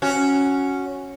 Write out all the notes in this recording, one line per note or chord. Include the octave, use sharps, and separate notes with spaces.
C#4 F#4